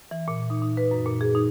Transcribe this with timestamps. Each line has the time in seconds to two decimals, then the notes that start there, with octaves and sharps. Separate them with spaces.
0.11 E3
0.28 A#2
0.50 D#4
0.62 D#4
0.77 B4
0.91 F#2
1.06 A#2
1.21 G#4
1.35 D#4